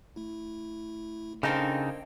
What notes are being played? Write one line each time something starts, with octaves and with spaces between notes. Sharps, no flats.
A3 E4
C#3 A#3 C4 D4 D#4 A4 D#5 G5